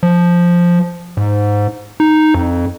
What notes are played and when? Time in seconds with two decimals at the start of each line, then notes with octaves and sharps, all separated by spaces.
0.03 F3
1.17 G#2
2.00 D#4
2.34 F2